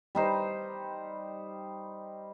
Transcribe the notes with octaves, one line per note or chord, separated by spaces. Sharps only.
G3 D#4 C5